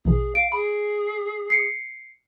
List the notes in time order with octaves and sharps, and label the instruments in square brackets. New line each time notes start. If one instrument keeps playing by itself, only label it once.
[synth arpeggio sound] A#1 B2 E3 [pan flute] G#4
[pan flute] F5 [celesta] D7
[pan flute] G#4 [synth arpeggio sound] B5
[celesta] C7 C#7